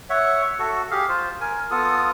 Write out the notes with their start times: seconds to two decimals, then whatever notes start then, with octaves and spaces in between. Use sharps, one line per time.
0.10 C#5 E5 F#5
0.59 F#4 A4
0.91 G4 G#4 F5
1.09 F4 C5
1.41 A#4 G#5
1.71 B3 F4 A4 D#6